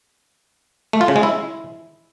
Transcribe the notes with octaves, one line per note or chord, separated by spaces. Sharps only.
A3
F4
C#3
G#3
E4